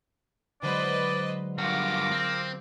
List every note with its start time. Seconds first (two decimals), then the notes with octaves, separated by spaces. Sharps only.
0.62 D3 F#3 G#3 B4 C5 D5 D#5
1.58 G2 F4 F#4 A#4 D6
2.11 C4